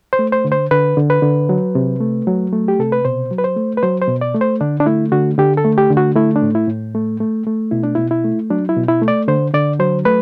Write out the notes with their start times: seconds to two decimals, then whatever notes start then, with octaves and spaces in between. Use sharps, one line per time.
0.13 C5
0.19 A3
0.32 C5
0.45 D3
0.52 C5
0.71 D3 B4
0.97 D3
1.10 B4
1.22 D3
1.49 F#3
1.75 C3
2.01 A3
2.27 F#3
2.53 A3
2.68 G4
2.79 C3 A4
2.92 B4
3.05 B2 C5
3.31 F#3
3.38 B4
3.44 C5
3.56 A3
3.77 B4
3.83 F#3 C5
4.01 C5
4.08 B2
4.21 D5
4.35 A3
4.41 C5
4.61 D3 D4
4.80 D4
4.86 A3 E4
5.12 D3 F#4
5.38 D3 G4
5.57 A4
5.65 A3
5.78 G4
5.90 D3
5.97 F#4
6.16 A3 E4
6.36 D4
6.42 A2
6.55 E4
6.68 A2
6.95 A3
7.20 A3
7.46 A3
7.71 B2 E4
7.83 D4
7.95 B2 E4
8.11 E4
8.24 A3
8.50 F#3 D4
8.69 E4
8.76 B2
8.88 E4
9.02 A3
9.08 D5
9.28 D3 C5
9.54 D3 D5
9.80 F#3 C5
10.05 A3 B4